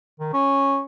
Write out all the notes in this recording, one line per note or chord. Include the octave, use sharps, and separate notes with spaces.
D#3
C#4